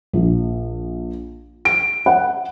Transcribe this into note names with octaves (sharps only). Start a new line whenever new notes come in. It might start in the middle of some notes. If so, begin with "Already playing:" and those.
A#1
D7
F#5